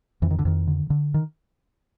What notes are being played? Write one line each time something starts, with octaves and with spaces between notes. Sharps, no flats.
F2 E3
D#3
D3
F2 D#3
D3
D3
D#3